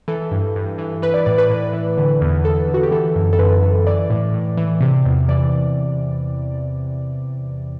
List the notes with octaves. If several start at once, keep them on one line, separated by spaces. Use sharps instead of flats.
E3 A4
G2
G2
E3
E3 B4
D5
A2 D5
B4
A2
E3
D3
E2
E2 A4
D3
F#4
G4
E3 A4
F#2
A4
F#2 B4
E3
E3 D5
A2
A2
E3
C3
E2
E3 D5